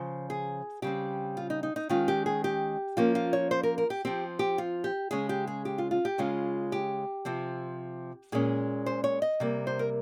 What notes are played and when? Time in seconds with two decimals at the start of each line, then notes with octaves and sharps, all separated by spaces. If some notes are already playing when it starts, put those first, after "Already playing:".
Already playing: C#3 F3 C5
0.30 G#4
0.82 C#3 G3 C4 G4
1.37 F4
1.50 D#4
1.63 D#4
1.76 D#4
1.89 D#3 G#3 C#4 F4
2.08 G4
2.26 G#4
2.44 G4
2.97 F3 A#3 C#4 F4
3.15 F4
3.33 C#5
3.51 C5
3.63 A#4
3.78 A#4
3.90 G4
4.05 F3 C4 G4
4.39 G4
4.58 F4
4.84 G4
5.11 C#3 G#3 C#4 G#4
5.29 G4
5.47 G#4
5.65 G4
5.78 F4
5.91 F4
6.05 G4
6.18 C#3 G#3 C#4 F4
6.72 G4
7.25 C3 F3 C4
8.32 A#2 G#3 C#4 G#4
8.86 C5
9.04 C#5
9.22 D#5
9.40 C3 G3 A#3
9.67 C5
9.79 A#4